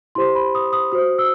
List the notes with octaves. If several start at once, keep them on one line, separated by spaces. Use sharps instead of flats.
E4 G4 C5 C6
B5
D#6
D#6
F#4 C5 D#6
E6